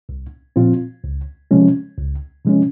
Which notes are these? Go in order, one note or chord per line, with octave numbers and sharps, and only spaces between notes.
C2
A#2 F3 C4 F4
C#2
C3 F3 G#3 C#4
C#2
C3 F3 G#3 C#4